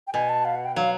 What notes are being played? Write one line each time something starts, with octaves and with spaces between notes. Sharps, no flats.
G5
B2 G#5
A5
F5
F#5
G5
F#3 F5